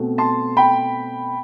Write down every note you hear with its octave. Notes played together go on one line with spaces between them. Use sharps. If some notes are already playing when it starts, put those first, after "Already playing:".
Already playing: B2 A3 C4
A5 C6
G5 B5